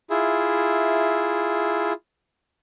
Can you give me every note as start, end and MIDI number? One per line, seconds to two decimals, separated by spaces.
0.10 1.93 64
0.10 1.93 65
0.10 1.93 68
0.10 1.93 76